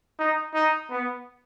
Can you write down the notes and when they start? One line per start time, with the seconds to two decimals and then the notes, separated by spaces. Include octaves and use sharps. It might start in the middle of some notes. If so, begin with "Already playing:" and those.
0.19 D#4
0.54 D#4
0.91 B3